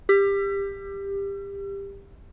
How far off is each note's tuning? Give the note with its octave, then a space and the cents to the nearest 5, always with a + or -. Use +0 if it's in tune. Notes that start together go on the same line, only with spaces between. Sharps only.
G4 +20 E6 +45